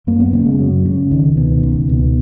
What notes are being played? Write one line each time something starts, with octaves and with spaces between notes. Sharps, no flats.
F#2 A#3
B3
C#3 A#3
G#3
F#2 F#3
C#3
C#2 D#3
B2
C#2
B2